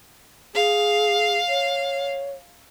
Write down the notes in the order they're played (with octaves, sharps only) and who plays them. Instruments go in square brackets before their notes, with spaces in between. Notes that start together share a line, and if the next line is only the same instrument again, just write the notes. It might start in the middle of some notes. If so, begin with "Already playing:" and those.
[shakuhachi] G#4 [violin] F5
[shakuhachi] C#5